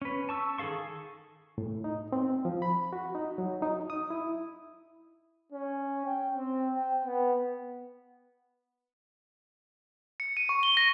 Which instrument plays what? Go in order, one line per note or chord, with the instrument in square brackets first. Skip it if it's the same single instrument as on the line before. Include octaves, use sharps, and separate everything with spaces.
[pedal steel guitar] C#4 B4
A5 C#6 E6
D#3 G#4 A4 F5 C#6
[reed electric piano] A2
D#4
C4
F3
B5
F#4
D#4
F#3
D#4
D#6
E4
[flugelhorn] C#4
G5
C4
G5
B3
[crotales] C#7
D#7
C#6
G7
A#6